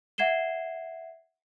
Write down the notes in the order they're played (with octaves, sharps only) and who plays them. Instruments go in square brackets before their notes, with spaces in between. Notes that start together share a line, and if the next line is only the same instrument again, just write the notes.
[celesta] E5 F#5 G#6 C7 E7 G7